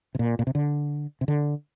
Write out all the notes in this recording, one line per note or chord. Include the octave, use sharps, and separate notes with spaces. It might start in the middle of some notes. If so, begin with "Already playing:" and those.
C3
A#2
A#2
C3
D3
C3
D3